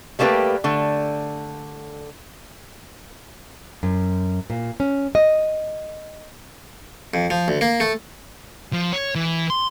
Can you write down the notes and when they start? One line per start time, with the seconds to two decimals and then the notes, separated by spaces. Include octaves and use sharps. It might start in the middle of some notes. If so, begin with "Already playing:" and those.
0.19 G3 A3 A#3 D4 G4 B4
0.64 D3 A3
3.83 F#2
4.50 A#2
4.80 C#4
5.15 D#5
7.14 F2
7.30 F3
7.48 D2
7.61 A#3
7.80 A3
8.73 F3
8.93 C#5
9.15 E3
9.50 C6